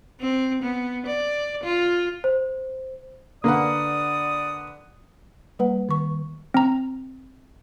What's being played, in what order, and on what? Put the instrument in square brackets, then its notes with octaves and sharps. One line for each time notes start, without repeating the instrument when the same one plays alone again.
[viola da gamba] C4
B3
D5
F4
[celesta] C5
[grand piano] D3 B4 F#5 [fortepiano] A#3 [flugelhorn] D5 [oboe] D#6
[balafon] G3 A#3 B4 F#5
D#3 C#6
[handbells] C4 A#5